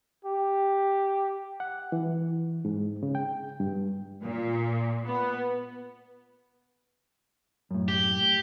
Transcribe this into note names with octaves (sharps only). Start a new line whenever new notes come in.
G4
F#5
E3
G#2
C#3
G5
G2
A#2
B3
F#2 A2
G4